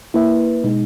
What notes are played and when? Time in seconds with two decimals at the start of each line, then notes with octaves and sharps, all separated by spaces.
0.14 A#3 E4 B4 E5
0.64 B2 G#3 D#4